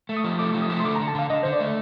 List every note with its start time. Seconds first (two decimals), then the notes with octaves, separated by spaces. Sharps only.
0.09 A3
0.17 D#6
0.24 F3
0.39 A3 D6
0.54 F3
0.62 D#6
0.70 A3
0.80 C6
0.85 D3 D6
0.96 A#5
1.00 D3
1.08 A5
1.15 D3 F5
1.30 D3 D#5
1.43 D3 C5
1.53 D5
1.60 A3